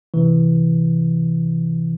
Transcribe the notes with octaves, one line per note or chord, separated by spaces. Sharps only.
C#2 C3 E3